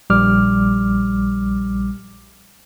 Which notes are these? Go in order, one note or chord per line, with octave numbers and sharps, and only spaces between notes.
A#1 G3 D6 F6